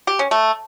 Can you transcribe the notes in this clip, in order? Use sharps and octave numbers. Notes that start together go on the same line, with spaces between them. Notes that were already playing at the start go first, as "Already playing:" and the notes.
G4
C#4
A3